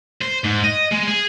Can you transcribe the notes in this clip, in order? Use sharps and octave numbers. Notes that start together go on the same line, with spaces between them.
C5
G#2
D#5
G#3
G#4